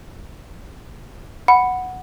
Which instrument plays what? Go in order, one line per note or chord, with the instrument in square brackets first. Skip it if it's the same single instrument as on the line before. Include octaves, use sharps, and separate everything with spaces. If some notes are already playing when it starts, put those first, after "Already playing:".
[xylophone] F#5 [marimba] B5